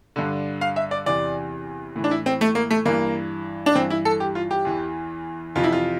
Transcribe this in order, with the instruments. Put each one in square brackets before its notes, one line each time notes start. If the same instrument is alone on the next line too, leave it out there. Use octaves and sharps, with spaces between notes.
[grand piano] G2 D3
F5
E5
D5
E2 C3 E3 D5
A2 E3
D4
E4
C4
A3
A#3
A3
G2 E3 A#3
D4
G2 E3 C4
E4
A4
G4
F4
G4
E2 E3
F2 C3 E3 F4
E4
F4